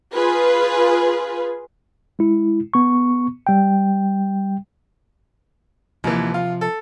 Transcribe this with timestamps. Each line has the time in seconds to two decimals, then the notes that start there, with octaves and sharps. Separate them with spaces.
0.14 F4 G#4 B4
2.19 G#3 E4
2.74 B3 C#6
3.47 G3 G5
6.04 D#2 C3 E3 F3
6.34 F4
6.61 A4